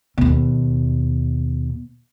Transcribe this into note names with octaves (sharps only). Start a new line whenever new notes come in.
D#2 B2